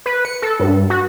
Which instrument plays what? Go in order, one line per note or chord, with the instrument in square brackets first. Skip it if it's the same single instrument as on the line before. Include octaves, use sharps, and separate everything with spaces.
[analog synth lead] B4
C#7
A4
G2
F#4